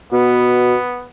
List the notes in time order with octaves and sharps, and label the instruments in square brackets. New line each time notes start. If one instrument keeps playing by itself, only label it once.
[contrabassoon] B2 [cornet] B3